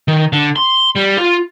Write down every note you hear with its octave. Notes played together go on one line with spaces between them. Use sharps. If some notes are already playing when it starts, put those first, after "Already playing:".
D#3
D3
C6
G3
F4